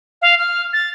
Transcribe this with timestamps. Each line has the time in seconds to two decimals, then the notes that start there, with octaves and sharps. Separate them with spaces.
0.22 F5
0.39 F6
0.73 A6